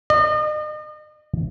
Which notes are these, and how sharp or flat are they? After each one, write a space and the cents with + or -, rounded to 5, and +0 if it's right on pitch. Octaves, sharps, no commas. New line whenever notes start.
D#5 -40